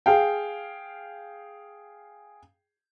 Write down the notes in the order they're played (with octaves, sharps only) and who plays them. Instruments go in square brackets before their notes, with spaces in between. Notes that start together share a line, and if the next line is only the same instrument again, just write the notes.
[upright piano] G#4 F5 G5